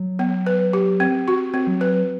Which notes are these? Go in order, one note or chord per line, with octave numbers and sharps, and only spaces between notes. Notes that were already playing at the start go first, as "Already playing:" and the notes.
Already playing: F#3
B3
B4
G4
C4
F#4
C4
F#3
B4